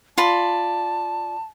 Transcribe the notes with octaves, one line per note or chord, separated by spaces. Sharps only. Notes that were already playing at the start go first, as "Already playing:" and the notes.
F4 D5 A5 B5